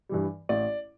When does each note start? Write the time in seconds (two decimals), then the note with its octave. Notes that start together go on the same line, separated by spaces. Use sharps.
0.09 G2 E3 G3
0.49 A1 D5